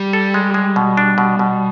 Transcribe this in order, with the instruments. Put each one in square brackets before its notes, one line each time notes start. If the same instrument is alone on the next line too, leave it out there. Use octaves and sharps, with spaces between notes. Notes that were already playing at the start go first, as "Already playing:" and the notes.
Already playing: [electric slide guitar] G3
[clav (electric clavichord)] A4
G#3
G#3
B2
D4
B2
B2